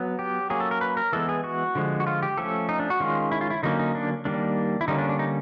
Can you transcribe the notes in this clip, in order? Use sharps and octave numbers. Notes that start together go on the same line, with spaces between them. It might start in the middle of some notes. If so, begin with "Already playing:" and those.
Already playing: F#3 B3
G4
F#3 A#3 C#4 G#4
A4
A#4
B4
A#4
E3 G#3 B3 A4
G#4
F#4
D3 F3 G#3
F#4
F4
G4
F3 A3 C#4 A4
D#4
D4
F#4
D#3 G#3 C#4 F4
E4
F4
E4
D3 F#3 A#3 C#4 D#4
D#4
D4
D#3 G3 A#3 D4
E4
D3 G3 A#3 C#4 D#4
D4
D4
D#4